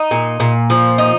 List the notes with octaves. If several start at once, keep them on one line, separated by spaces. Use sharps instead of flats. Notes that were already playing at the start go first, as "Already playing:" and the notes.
Already playing: D#4
A#2
A#2
F3
D#4